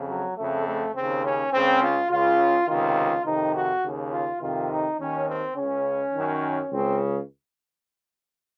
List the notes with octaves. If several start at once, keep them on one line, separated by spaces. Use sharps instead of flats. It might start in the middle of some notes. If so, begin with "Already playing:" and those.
Already playing: F2 C#3
F#3
F2 C#3 A3
A3
D#2 C#3 C4
C#4
C#2 C#3 C4
F4
C#2 C#3 F4
C#2 C3 D#3 F4
F2 C3 D#3 D#4
F#4
D#2 C#3
F4
F2 C3 D#3 F4
D#4
D#2 D#3 C#4
C4
C#2 C#3 C#4
F#2 D#3
C#2 C#3 C4